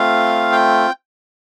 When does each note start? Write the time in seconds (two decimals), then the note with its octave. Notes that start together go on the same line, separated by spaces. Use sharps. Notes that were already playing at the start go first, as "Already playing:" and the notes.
Already playing: A3 C4 F4 F5
0.52 G5